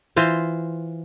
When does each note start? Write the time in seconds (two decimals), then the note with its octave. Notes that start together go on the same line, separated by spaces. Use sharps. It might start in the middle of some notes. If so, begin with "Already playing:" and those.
0.16 E3 F4 C5